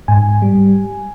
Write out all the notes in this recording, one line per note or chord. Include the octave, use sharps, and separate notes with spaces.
G#2 G#5
G3